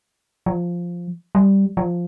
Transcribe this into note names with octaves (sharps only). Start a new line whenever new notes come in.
F3
G3
F3